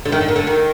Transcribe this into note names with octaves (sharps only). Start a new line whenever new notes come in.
D3
D#3
D3
D#3
D3
D#3